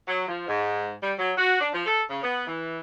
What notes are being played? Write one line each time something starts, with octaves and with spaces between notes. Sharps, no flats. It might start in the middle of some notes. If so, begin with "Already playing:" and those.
F#3
F3
G#2
G3
F#3
F#4
D4
F3
A4
C#3
B3
E3